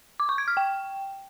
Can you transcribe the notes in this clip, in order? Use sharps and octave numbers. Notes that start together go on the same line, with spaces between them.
D6
C#6
G#6
F6
G5